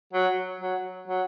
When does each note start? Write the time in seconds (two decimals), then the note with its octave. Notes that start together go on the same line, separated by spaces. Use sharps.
0.13 F#3
0.61 F#3
1.08 F#3